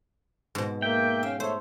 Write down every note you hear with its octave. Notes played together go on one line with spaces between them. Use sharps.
G#2 B2
A#3 E5 G5
C#4 E5 F5
A3 A4 C5 C#5